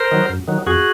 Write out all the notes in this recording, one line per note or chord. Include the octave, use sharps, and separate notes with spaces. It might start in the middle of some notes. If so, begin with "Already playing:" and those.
Already playing: A#4 C5
D#3 F#3
F#2
D#3 F#3
F2 F#4 G#4